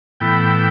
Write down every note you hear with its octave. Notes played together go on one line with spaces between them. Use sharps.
A2 E3 B3 E4 G5